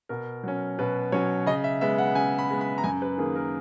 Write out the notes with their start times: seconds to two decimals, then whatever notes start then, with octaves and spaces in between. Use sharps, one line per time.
0.09 B2 A#4
0.44 F#3 C#4
0.79 B2 B4
1.12 F#3 C#4 C#5
1.46 C#3 D#5
1.64 E5
1.81 G#3 B3 E5
1.98 F#5
2.15 C#3 G#5
2.39 B5
2.50 G#3 B3
2.61 B5
2.78 A#5
2.84 F#2 G#5
3.02 B4
3.18 D#3 A#3 G#4
3.36 A#4